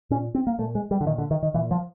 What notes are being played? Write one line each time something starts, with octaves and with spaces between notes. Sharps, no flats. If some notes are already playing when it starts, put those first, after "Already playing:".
A#2 C#4
C4
A#3
A#2 A3
G#3
G3
D3
A#2 D#3
D3
D#3
D#3
A#2 E3
F3